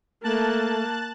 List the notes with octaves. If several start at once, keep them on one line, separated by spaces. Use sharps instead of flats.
A3 A#3 A5 F#6 A6